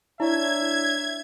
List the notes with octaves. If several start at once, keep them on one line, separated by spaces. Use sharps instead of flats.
D4 E4 C#5 E5 G#6